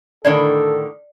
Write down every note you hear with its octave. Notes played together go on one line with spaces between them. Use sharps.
A2 D3 D#3 A4 D5